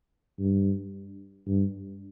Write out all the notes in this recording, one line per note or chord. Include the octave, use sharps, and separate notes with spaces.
G2
G2